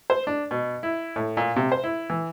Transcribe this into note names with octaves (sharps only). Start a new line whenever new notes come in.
C5
D4
B2
E4
A2
A#2
C3
C5
E4
E3